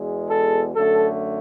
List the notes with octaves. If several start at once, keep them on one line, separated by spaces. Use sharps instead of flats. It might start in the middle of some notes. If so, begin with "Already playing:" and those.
Already playing: E2 B2 G#3
A4
F#2 D3 A3 A4